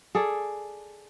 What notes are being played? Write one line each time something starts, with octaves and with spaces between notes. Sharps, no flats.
G#4 A4 D5